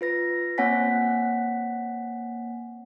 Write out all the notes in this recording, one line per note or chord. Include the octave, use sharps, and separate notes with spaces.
F4 B4 A#6
A#3 C4 C#5 F#5 G#5 B6